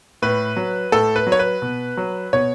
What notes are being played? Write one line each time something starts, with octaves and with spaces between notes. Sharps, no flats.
A2 B4
F#3
A2 A4
B4
F#3
C#5
B4
B2
F#3
B2 C#5